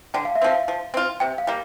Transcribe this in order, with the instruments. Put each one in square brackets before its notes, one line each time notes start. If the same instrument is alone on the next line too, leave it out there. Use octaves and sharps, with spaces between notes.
[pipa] D3 [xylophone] G5
[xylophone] F5
E5
[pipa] F3 C4 [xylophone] F5
[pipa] F3
C4 F4
[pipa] C3 [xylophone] G5
[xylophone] F5
[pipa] G3 A#3